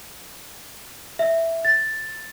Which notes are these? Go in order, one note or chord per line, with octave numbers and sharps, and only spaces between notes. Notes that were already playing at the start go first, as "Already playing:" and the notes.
E5
A6